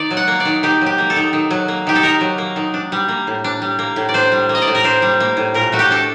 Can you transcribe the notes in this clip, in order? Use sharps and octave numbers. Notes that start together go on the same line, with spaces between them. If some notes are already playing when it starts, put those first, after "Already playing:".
Already playing: D#3 D5
F#3
F#5
A#3
D5
D#3
D#3 G4
F#3
G4
A#3
A4
D#3
D#3
F#3
A#3
D#3 G4
A4
D#3 A#4
F#3
A#3
D#3
D4
G3
A#3
A2
D4
G3
A#3
A2
D5
D4 C5
G3
A#3
D#5
D5
A2
A#4
D4 C5
G3
A#3
A2
A#2 A#4
A3 F#4
G4
D4 A4